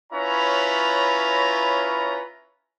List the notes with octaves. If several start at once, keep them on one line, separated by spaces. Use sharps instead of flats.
C#4 E4 F4 B4 C#5 A#5